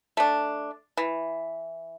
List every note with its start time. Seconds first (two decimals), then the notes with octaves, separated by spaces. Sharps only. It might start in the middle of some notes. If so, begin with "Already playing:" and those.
0.17 A3 D4
0.97 E3